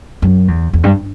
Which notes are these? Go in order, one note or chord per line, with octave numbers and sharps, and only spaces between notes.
F#2
E2
E2
G2